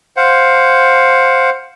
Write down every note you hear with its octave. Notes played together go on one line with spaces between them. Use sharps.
C5 F5 F#5